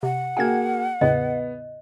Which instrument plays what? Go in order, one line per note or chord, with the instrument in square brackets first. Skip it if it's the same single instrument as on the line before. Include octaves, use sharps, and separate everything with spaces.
[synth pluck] C3 [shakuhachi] F#5
[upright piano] A#3 F#4 G#4 [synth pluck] G5 G#6
[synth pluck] E2 A2 C#3 [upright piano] B3 [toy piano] D#5